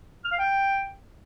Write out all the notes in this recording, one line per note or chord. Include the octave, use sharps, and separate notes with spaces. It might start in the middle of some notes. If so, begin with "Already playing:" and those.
F6
F5
G5